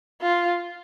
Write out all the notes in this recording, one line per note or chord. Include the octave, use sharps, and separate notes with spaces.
F4